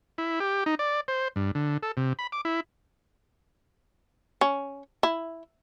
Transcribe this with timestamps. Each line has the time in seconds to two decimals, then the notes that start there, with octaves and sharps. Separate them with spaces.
0.18 E4
0.40 G4
0.66 D#4
0.79 D5
1.08 C5
1.36 G2
1.55 D3
1.83 A4
1.97 C3
2.19 B5
2.32 D6
2.45 E4
4.41 C#4
5.03 E4